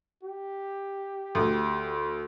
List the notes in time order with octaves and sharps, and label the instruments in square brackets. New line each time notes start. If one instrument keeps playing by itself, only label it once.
[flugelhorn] G4
[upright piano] D2